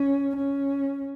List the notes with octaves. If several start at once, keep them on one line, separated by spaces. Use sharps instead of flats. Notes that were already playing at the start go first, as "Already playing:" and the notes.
Already playing: C#4
C#4